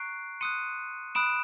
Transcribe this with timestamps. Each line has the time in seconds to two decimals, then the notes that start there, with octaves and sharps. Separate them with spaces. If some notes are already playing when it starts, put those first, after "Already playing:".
Already playing: A#5 C#6 F#6 C7 D7
0.41 C6 D#6 F#6 C#7 D#7
1.15 B5 D#6 F#6 D7 E7